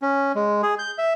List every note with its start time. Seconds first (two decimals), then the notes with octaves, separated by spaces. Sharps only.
0.02 C#4
0.35 G#3
0.63 G#4
0.79 G6
0.98 E5